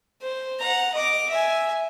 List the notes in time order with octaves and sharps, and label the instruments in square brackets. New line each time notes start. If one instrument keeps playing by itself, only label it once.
[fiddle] C5
F#5 A#5
D#5 D6
E5 G#5